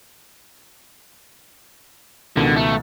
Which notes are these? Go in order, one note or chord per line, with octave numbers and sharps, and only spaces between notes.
C#2 B2 D3 D#3
A3